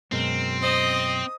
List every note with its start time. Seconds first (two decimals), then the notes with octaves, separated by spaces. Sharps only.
0.12 F#2 B2 G#3 C4 A#4
0.61 C5 D#5 D#6